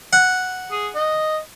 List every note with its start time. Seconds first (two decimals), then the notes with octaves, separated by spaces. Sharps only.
0.13 F#5
0.71 G#4
0.95 D#5